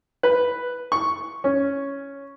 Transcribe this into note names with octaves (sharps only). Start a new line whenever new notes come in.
B4
C#6
C#4